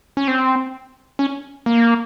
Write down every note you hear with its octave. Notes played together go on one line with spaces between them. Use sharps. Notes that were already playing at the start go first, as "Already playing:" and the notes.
C#4
C4
C#4
A#3